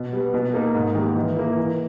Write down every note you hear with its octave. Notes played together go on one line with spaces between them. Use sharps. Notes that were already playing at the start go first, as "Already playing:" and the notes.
Already playing: B2
G3 B3
B2
A#3 D#4 A#4
G#2
D#3 G3 A#3
E3
A#3 E4
E3